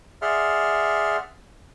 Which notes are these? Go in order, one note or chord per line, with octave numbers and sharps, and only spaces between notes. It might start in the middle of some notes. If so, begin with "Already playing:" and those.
G#4 D5 E5 F#5 C6 F6